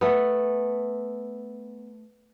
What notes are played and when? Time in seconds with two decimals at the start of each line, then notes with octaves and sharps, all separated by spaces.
0.01 A3 B3